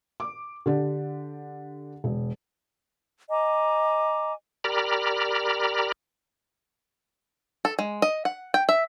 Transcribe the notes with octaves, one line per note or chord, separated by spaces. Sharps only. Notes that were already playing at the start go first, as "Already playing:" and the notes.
D6
D3 D4 G4
E1
D#5 G#5 A#5 D6
G4 A#4 D5 A#5 B5 F6
A4
G#3
D#5
F#5
G5
E5